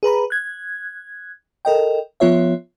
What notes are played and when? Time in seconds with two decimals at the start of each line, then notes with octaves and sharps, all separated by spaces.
0.03 G#4 B4 A#5 B5
0.30 F#6 G#6
1.65 A4 A#4 D#5 G5
2.20 F3 B3 F4 C#5 E5